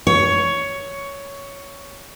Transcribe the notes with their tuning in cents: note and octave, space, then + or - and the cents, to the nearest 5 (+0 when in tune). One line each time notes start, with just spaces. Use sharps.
C#5 +10